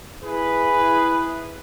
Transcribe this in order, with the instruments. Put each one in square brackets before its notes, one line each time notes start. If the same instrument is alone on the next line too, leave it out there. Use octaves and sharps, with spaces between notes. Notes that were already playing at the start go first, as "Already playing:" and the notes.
[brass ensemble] E4 G#4 B4